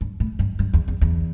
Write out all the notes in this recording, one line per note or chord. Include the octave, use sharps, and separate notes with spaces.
G2
A2
G2
G2
E2
E2
E2